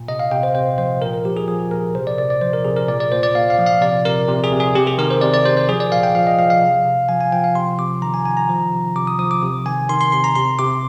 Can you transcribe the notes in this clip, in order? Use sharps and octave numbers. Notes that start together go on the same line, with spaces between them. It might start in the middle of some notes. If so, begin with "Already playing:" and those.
Already playing: A#2
C3 D#5
F5
C3 G5
C5
C3 C5
F3 C5
A#2 A#4
A#4
F3 G4
G#4
F3 G#4
A#2 A#4
C3 C5
D5
C3 D5
D5
F3 C5
A#4
C3 G#4
A#4
A#2 D5
D5
A#2 C5
D5
A#2 F5
F5
F3
F5
C3 D5
C3 A#4
C3
G#4
C3
G#4
C3 G4
G#4
D#3 A#4
C5
C3 D5
D5
C3 C5
C5
F3 G#4
D5
A#2 F5
G5
F3 F5
D#5
F3 F5
F5
C3
C3
F3 G#5
G#5
F3 G5
F5
C3 C6
C3 D6
D#3 A#5
G#5
D#3 G#5
A#5
F3
C3
C3 D6
D#6
F3 D#6
D6
C3
D#3 G#5
D#3 C6
C6
C3 C6
A#5
C3 C6
C3 D6